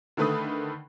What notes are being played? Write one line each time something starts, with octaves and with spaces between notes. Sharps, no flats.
D3 D#3 A3 B4 B5 D#6